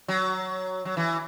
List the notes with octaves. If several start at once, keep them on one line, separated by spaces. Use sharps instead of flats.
F#3
F#3
E3